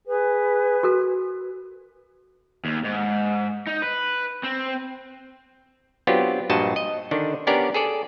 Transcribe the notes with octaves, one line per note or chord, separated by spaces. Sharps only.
G#4 B4
F#4 A4 A#4
D#2
G#2
D#4
B4
C4
F#3 B3 C4 D4 F4 G4
G2 A#2 F3 F#4 D#5 A5
D#5
D3 D#3 D4
B3 C#4 D4 G4 A#4 D5
G#4 A4 D5